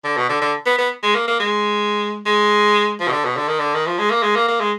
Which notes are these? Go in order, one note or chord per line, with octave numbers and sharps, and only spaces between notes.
D3
B2
D3
D3
B3
B3
G#3
A#3
A#3
G#3
G#3
F3
B2
D3
B2
D3
D#3
D3
D#3
F3
G#3
A#3
G#3
A#3
A#3
G#3